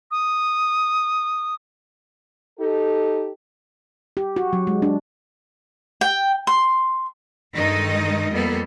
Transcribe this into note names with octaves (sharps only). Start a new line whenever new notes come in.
D#6
D#4 G4 A4
G4
F#4
F#3
G#3
D4
G5
C6
G2 D#3 G#3 D#4 A4 D#5
F2 G3 A#3 B3 A4